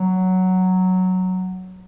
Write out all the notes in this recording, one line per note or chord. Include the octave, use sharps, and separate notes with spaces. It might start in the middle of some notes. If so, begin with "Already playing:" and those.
Already playing: F#3